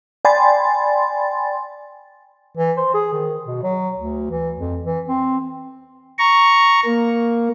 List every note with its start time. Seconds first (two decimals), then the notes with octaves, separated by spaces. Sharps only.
0.25 D5 G5 G#5 B5 C6 A6
2.57 E3
2.77 C5
2.94 G#4
3.13 D#3
3.46 B2
3.63 F#3
3.97 D2
4.30 E3
4.57 F2
4.85 E3
5.08 C4
6.19 A#5 C#6
6.85 A#3